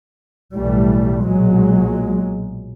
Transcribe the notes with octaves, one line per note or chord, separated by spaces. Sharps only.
B1 A2 E3 G3 A3
B1 A#2 F#3 G#3